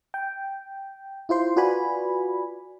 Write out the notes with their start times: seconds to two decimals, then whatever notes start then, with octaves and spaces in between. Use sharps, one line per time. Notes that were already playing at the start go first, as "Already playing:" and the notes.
0.14 G5
1.29 E4 F4 C5 C6
1.56 F4 F#4 B4 D5 G#5 B5